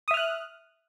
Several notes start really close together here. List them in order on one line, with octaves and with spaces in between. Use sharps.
D#6 E5 F6 F#6